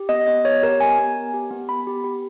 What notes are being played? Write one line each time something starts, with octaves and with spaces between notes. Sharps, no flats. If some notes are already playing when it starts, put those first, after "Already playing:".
Already playing: G4
B3 D#5
B3 D#5
G4 C#5
G4 A#4
B3 G#5
B3
G4
G4
B3
B3 B5
G4
G4